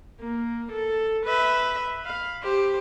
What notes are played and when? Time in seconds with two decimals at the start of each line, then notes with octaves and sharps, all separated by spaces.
0.20 A#3
0.72 A4
1.26 B4 E5
2.02 F5 B5
2.42 G4 C5